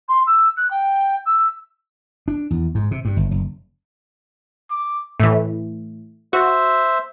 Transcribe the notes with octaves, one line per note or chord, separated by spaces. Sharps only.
C6
E6
F#6
G5
E6
D4
E2
G#2
C3
G2
G1
F#1
D6
A2 E3
F#4 C5 E5